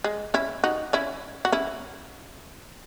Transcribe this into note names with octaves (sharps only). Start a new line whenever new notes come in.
G#3
C#4 E4
D#4 F#4
C#4 E4
F#4
C#4 E4